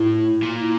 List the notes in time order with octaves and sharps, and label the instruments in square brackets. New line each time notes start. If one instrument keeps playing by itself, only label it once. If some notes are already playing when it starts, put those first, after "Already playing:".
Already playing: [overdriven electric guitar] A2 [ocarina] E4
[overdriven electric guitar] A#2